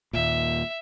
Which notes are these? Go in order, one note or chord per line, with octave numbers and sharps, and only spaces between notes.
D#2 A#2 E5